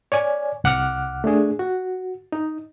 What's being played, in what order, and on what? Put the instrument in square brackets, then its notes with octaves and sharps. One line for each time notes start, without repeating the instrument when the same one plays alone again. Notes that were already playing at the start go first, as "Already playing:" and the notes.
[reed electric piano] C#5 D5 G#5
C2 F#5 D6 F6 F#6
A3 D4 G#4
F#4
D#4